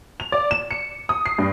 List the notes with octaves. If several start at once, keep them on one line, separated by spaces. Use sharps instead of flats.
F7
D5
E7
C#7
D#6
C7
G2